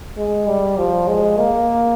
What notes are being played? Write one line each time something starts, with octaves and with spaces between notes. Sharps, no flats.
G#3
G3
F3
G#3
A#3